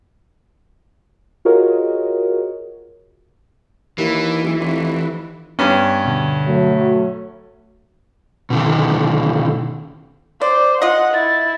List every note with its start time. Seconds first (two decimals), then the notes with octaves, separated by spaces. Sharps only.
1.45 F4 F#4 G#4 A#4 C#5 D#5
3.98 D#2 E3
4.44 F#1
4.60 F1
5.59 G2 B3 C#4
6.05 B2 D3
6.45 F#3 A3
8.50 B2 D3 D#3
10.41 C5 D5
10.82 F4 D#5 F#5
11.14 E4 A6